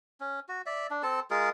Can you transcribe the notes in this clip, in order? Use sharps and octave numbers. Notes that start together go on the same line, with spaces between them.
C#4
F#4
D5 E5
D4
C4 A4 A5
G#3 F4 G#4 A#4